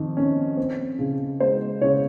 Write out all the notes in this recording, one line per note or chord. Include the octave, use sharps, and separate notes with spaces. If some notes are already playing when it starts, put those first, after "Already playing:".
Already playing: F2 D#3
C#4
C4
C#3
G#3 C5
C#3 C#5